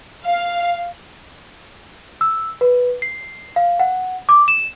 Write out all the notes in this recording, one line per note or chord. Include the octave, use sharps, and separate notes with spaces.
F5
E6
B4
C7
F5
F#5
D6
E7